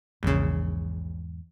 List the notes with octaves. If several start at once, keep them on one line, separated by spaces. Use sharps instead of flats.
A#1 E2 G#2 C#3